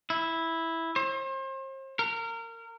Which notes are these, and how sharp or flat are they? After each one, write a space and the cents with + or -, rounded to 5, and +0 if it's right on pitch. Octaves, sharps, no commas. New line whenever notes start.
E4 -5
C5 +40
A#4 -25